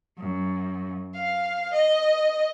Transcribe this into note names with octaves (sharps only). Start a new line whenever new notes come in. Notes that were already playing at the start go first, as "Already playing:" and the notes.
F#2
F5
D#5